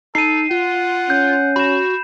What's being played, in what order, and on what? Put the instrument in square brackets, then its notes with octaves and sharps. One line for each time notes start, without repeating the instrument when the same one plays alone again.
[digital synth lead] D#4 [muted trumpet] A4 [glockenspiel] C7 D#7
[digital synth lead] F4 [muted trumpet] F#5
[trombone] C#4 [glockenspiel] G6
[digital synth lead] F#4 [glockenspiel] B5 E7